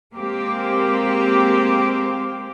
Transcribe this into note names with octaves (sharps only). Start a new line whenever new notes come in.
G#3 A#3 C4 G4